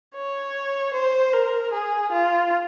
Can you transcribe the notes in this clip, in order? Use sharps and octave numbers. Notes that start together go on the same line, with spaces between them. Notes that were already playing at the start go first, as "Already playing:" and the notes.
C#5
C5
A#4
G#4
F4